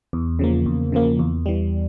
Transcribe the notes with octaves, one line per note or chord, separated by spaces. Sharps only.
E2
C#3 F3 A#3
E2
C#3 F3 A#3
E2
E3 G3